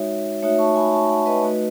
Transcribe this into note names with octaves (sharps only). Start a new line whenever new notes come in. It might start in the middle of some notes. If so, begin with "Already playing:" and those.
Already playing: G#3 D#4 F#4 C#5 E5
A3 D#4 F#4 C#5 E5
A5 C#6
G#5 B5
A5 C#6
F#5 A5
B4 D#5
A3 D#4 F#4